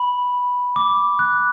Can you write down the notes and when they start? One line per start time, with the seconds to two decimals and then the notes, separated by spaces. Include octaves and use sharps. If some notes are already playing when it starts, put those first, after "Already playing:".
Already playing: B5
0.76 D6
1.19 F#6